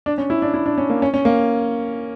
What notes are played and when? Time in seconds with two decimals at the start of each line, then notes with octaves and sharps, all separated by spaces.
0.06 D4
0.18 C#4
0.30 E4
0.42 D4
0.54 E4
0.66 D4
0.78 C#4
0.90 A#3
1.02 C#4
1.14 C#4
1.25 A#3